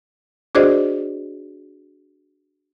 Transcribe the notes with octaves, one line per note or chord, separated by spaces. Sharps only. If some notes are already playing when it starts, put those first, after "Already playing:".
D4 F#4 G#4 C5 D5 D#5